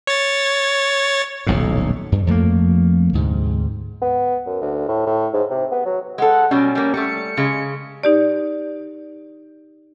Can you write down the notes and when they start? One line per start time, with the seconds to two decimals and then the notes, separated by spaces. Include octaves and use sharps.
0.07 C#5 A6
1.47 D#1 B1 F2 A2
2.12 G2
2.27 F2 F3 A3 A#3
3.13 D2 G#2 C3
4.02 B3
4.46 F#2
4.61 D2
4.88 A2
5.06 A2
5.33 G#2
5.50 C3
5.71 B3
5.85 F#3
6.18 G#3 A4 F#5
6.51 B2 F#3 G3 C#4
6.75 G3 A#3
6.94 G3 A3 C#7
7.37 C#3 G#3
8.03 D#4 G4 D5